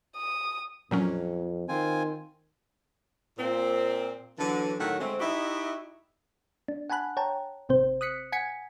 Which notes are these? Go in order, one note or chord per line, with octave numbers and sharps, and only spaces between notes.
D#6
F2 A#2 F#3 C#4
D#3 C4 F4 G#5
A#2 C4
D3 E3 F#3
A2 D#3 F#3 A3 F#4 F#5
D3 G#3 A3 C4
D#4 E4 F#4 G4 D#5 E5
D4
F#5 G#5 A5 B5 F#6
C#5 G5 A5 A#5
G#1 C3 C4 C5
D#6 F#6 B6 C#7
F#5 G#5 G#6 B6 C#7